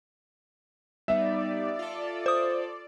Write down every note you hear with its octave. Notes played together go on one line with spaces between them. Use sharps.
G3 B3 D#4 D5 E5
F4 A4
C5 D#6